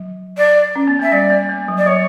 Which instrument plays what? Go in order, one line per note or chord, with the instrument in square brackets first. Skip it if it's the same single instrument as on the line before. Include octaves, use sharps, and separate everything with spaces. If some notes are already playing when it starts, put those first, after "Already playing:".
Already playing: [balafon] F#3
[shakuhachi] D5
[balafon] C#4
B3
[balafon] A#3 [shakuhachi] E5
[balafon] G3 [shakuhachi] D5
[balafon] A#3
A#3
F#3
[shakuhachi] D5
[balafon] F#3 [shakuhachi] C#5